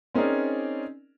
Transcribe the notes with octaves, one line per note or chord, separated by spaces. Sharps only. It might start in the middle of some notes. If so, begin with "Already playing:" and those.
C4 C#4 D#4 G#4 A#4 D5